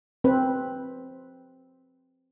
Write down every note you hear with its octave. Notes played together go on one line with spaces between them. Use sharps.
C4 B4